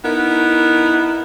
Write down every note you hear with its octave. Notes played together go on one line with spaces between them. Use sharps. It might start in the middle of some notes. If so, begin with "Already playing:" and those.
B3 D#4 E4 A#4